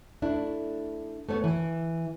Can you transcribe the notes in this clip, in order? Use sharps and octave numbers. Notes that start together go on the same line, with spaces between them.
A3 D4 E4
A3 B3 C#5
E3